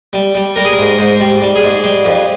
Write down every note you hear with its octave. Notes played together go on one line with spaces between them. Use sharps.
G3
G3
G3 A#4
G#4
A#4
G#2
G#2 C5
G3
G3
G#4
G#2
G3
F2